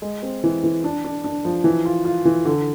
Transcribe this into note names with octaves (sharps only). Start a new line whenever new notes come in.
G#3
C4
E3
E3
D4
D4
D4
F3
E3
F4
F4
E3
D3